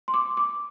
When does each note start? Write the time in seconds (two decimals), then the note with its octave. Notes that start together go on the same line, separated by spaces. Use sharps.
0.08 C6
0.14 D6
0.37 D6